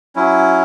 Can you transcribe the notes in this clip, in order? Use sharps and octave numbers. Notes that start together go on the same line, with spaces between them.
F#3 C#4 E4